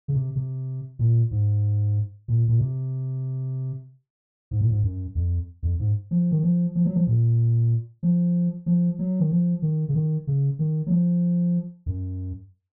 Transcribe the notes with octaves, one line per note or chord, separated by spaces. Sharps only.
C#3
C3
C3
A#2
G#2
A#2
A#2
C3
G#2
A#2
G#2
F#2
F2
F2
G#2
F3
D#3
F3
F3
F#3
F3
A#2
F3
F3
F#3
D#3
F3
D#3
C#3
D#3
C#3
D#3
F#3
F3
F#2